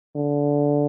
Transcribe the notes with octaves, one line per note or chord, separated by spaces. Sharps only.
D3